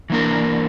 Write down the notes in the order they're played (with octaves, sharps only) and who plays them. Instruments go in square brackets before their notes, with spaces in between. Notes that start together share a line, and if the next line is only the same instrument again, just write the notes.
[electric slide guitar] E3 A#3 D4 A#4